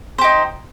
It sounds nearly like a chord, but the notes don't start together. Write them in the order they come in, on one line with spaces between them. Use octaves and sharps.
C5 G4 D#4